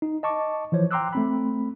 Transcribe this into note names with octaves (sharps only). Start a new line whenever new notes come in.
D#4
D#5 A5 C#6 D6
E3 F3 C5 C#5
G5 A#5 C6 D6 E6 F#6
A3 C4 B5